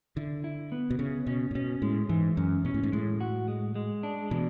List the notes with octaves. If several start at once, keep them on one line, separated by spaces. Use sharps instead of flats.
D3 E4
E4
B3
B2
C#3 C#4
B2 C#4
A2
B2 C#4
A2 G#3
G#2 E3
F#2 C#4
B2 C#4
A2
G#2
A2 G#3
F#4
G#3
G#3
D4
B2 E3